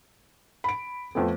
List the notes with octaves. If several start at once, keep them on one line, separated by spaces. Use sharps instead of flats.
B5 D7
F2 A3 B3